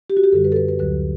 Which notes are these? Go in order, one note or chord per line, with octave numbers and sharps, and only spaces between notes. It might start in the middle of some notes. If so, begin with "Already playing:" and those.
G4
F#4
G4
F#2 D3 G3 A4
B4
A4
B4
B4
D2 D3 F#3 B4